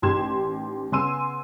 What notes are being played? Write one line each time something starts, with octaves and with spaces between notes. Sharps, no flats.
A1 D#3 G4 C6 G#6 E7
C#3 B3 G#5 C6 E6 D#7